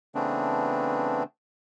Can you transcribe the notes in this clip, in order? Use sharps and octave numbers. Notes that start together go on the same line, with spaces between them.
C#3 E3 A3 B3 C4 D4